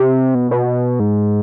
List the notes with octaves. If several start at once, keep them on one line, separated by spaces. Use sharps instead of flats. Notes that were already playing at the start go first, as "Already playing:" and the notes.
Already playing: C3
B2
B2
G#2